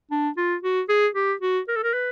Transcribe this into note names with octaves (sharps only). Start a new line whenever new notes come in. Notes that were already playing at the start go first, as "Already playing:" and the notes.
D4
F4
F#4
G#4
G4
F#4
A#4
A4
A#4
B4